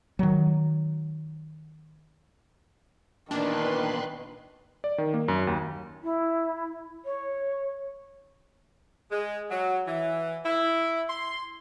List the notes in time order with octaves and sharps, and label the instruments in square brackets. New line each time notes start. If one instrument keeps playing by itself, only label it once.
[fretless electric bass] D#3 F#3
[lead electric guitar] E2 A#2 [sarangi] D#3 [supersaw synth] D4 [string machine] B4 C6 F#6
[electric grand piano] D5
D#3
A#3
F#2
D#2
[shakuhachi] E4
C#5
[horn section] G#3
F#3
E3
E4
C6